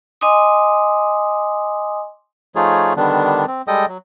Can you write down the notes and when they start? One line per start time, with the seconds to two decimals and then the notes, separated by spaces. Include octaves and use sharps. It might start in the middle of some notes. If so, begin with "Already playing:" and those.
0.21 D#5 G#5 C6 D6 D#6
2.56 F3 A3 D#4 F4 G#4 C#5
2.97 D3 D#3 G3 B3 D4
3.48 C4
3.68 G3 G#3 A4 D#5 G5 D#6
3.88 F#3